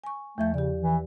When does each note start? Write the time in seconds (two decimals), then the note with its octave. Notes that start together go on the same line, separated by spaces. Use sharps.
0.04 G#5 C#6
0.38 E2 F3 A3 G6
0.54 C#3 G4 D5
0.82 E3